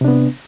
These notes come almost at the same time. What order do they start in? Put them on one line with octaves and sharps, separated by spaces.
C3 D4 B3